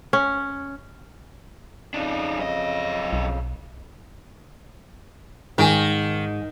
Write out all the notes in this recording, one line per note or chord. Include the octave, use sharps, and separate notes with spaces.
C#4
F2 C#3 D4 D#4
F#2 D#5
B1
G#2 D#3 G5 G#5